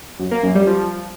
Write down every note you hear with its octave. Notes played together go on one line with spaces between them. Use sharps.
F#2
A#3
F#2
G3
F3